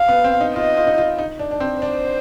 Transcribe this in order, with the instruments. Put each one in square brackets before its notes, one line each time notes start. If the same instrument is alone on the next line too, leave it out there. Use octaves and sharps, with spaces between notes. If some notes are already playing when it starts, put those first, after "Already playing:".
Already playing: [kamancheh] F5
[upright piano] B3
C4
D#4
[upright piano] F4 [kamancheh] D#5
[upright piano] F4
D#4
F4
D#4
D4
D4
C4
[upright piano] D4 [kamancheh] C5